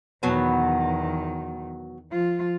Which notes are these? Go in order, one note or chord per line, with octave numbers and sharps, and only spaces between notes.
E2 B2 D#3 F#3 B3
F3 F4